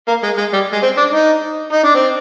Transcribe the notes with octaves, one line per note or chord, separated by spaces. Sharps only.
A#3
G#3
G#3
G3
G#3
C4
D4
D#4
D#4
D4
C4